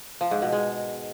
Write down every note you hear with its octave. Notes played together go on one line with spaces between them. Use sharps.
F3
G#2
B2
G#3